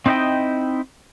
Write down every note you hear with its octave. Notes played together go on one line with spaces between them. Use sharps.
C4 D#4 E4 C5 D#5 G5